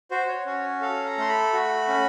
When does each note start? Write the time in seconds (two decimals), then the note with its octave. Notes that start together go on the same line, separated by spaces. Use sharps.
0.11 F#4 C5
0.28 C#5
0.46 C#4 C#5
0.81 A4 F5
1.06 A#5
1.18 A3 C6
1.29 B5
1.53 F#4
1.88 C#4